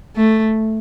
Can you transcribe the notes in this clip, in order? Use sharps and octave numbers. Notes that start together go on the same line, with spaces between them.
A3